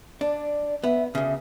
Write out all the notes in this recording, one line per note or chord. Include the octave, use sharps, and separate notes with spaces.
D4 D5
B3 E5
D2 C#3 E5